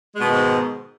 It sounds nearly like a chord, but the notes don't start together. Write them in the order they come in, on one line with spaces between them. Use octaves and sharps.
G#3 B2 D#3 G#2